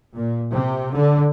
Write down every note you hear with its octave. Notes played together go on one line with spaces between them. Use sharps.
A#2
C3
D3